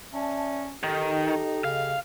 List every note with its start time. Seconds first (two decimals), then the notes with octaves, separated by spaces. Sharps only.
0.14 C#4 D5 E5 A5
0.83 D#3 D#4 G4 A4 D#5
1.64 C#3 F5